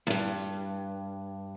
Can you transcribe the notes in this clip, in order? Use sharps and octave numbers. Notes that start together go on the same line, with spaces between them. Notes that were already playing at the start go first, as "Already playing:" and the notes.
E2 G2